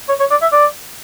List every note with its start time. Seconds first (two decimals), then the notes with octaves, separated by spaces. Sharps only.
0.08 C#5
0.20 C#5
0.31 D5
0.42 E5
0.52 D5